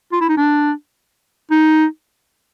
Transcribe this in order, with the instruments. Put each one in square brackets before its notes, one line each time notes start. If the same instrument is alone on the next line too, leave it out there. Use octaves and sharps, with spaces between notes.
[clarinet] F4
E4
D#4
D4
D#4